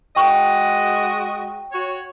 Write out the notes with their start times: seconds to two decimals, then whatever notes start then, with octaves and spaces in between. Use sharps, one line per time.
0.16 G#3 F#4 D#5 G5 C#6
1.73 F#4 C#5